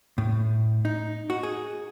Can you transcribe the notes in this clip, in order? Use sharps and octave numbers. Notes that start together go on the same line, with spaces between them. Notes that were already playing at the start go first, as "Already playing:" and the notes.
A2
D#4
F#4
G#4